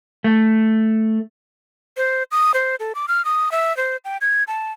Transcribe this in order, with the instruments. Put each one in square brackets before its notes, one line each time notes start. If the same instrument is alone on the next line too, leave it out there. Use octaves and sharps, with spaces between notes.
[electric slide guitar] A3
[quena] C5
D#6
C5
A4
D6
F6
D#6
E5
C5
G5
G#6
A5